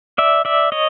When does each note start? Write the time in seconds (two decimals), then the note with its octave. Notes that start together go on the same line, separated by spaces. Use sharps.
0.18 D5 E5
0.45 D5 E5
0.72 C#5 D#5